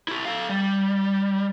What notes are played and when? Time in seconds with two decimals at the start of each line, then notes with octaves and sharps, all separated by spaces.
0.08 E4 G4
0.25 A4 F5
0.49 G3